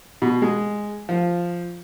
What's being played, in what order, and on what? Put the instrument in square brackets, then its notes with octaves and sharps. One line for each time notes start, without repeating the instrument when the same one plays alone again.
[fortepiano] B2
G#3
F3